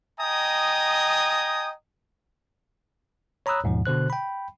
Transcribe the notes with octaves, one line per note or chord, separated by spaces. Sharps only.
D#5 G5 G#5 A#5 D#6
C#5 A#5 B5 D#6 E6 F#6
D#2 G#2 B2 F3
B2 D3 C5 F#6
G5 B5